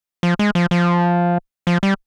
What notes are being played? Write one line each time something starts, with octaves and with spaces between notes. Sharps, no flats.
F3
G#3
F3
F3
F3
G3